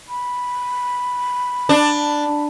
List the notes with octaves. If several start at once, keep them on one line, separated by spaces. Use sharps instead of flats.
B5
D4